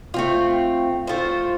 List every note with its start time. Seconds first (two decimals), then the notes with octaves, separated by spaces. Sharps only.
0.14 A3 C4 F4
1.07 A3 F4 C5